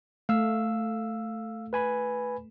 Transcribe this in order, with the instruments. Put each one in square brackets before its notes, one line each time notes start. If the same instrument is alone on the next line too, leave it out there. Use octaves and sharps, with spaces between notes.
[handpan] A3 [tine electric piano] F5 E6
[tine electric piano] B4 G#5 B5